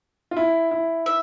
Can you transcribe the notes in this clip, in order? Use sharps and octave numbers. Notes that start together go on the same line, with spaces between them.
F4
E4
E4
E5